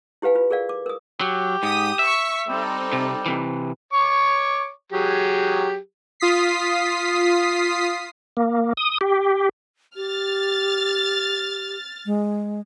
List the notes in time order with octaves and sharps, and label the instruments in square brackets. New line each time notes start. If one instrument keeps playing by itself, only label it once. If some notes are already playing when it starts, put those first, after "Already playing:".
[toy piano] E4 G4 B4 F5 G#5
F4 B4
G#4 A#4 D5 F5
D6
A#4 D#6
[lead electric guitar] F#3 [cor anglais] G4
[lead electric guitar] G#2 [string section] D#6 B6
[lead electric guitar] E5 [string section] C#6 B6
[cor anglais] G3 [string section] C4 D#4 A4
[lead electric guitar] C3
C3 E3
[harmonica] C#5 C#6 D6
F#3 G4 G#4
[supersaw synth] F4 D#6 B6 C7
[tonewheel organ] A#3
D#6
G4
[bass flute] G4 [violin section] F6 A6
[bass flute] G#3